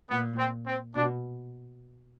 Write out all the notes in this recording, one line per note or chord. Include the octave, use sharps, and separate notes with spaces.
A#2 B3
C4
C4
B2 D4